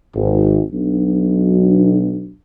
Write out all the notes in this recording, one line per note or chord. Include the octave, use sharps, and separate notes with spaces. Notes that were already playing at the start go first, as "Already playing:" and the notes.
G#1
B1 F#3 D4